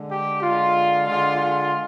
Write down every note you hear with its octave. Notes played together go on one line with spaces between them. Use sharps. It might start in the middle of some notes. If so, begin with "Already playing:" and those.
Already playing: D3 G#3
G4
D3 G#3 F4
D3 G#3 F4
F4